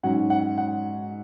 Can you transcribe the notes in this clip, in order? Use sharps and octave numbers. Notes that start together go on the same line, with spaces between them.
G#2 F#3 C#4 F#5
F#5
F#5